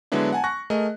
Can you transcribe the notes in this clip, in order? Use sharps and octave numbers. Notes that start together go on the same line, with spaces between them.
D3 F#3 G#3 B3 D4 E4
F#5 G#5 A5
C#6 F#6 A#6
A3 G#4 A#4 D#5